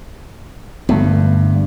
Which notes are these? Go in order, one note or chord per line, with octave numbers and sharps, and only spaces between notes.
G2 D3 A3 B3